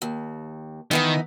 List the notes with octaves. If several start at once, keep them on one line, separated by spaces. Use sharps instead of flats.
D#2
D#3 E3 B3 D#4